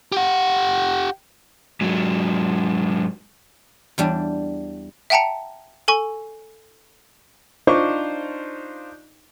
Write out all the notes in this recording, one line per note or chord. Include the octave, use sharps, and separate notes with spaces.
G4 F#5
G#2 F#3
E2 G3 D4
E5 F#5 G5 A5 A#5 C#7
A4 G#5 C#6
D4 D#4 F4 C5 C#6 D6